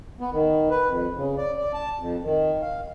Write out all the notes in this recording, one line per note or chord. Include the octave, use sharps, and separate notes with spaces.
B3
D#3
B4
F2
C#3
D5
D5
A5
F2
D#3
F5